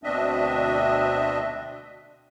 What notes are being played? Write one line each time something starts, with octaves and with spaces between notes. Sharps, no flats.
D2 B2 C4 D4 D#5 E5